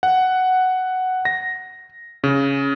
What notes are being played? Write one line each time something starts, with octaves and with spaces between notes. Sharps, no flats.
F#5
A#6
C#3